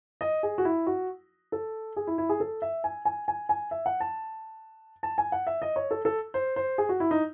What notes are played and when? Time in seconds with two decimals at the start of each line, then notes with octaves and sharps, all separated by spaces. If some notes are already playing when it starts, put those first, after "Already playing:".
0.21 D#5
0.43 G#4
0.58 F#4
0.65 E4
0.87 F#4
1.52 A4
1.96 G#4
2.07 E4
2.18 E4
2.29 G#4
2.40 A4
2.62 E5
2.84 G#5
3.05 G#5
3.28 G#5
3.49 G#5
3.71 E5
3.86 F#5
4.00 A5
5.03 A5
5.18 G#5
5.32 F#5
5.47 E5
5.62 D#5
5.76 C#5
5.91 A4
6.05 A4
6.34 C5
6.56 C5
6.78 G#4
6.89 F#4
7.00 E4
7.11 D#4